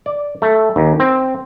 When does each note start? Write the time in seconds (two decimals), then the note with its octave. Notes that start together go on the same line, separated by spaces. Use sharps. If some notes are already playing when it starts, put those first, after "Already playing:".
0.06 D5
0.42 A3
0.76 D#2
1.00 C4